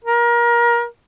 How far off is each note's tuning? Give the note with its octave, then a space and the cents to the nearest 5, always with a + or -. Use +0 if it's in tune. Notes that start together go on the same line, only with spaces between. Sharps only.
A#4 +25